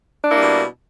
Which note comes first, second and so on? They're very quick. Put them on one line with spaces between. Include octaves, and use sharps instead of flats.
D4 E4 A#3 G3 B2